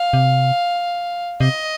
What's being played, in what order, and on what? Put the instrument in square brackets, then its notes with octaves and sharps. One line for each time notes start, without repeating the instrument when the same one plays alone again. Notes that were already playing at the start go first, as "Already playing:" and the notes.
Already playing: [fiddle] F5
[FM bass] C3
[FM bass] C3 [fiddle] D#5